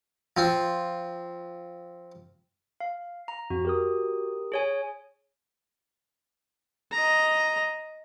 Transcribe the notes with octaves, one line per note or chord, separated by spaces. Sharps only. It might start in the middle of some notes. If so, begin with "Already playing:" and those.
F3 C4 F4
F5
A#5
F2 F#4
G4 A#4 D#6
G#4 C#5 G#5
D#5 A#5